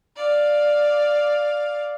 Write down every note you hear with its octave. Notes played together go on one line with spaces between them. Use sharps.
D5 F5